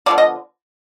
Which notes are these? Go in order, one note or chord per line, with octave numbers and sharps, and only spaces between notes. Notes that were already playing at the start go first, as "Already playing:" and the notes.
D3 F3 G#3 B3 D5
D#5